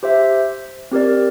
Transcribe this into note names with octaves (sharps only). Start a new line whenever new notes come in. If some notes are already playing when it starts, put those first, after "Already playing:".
G4 C5 E5
C4 G4 A#4 D5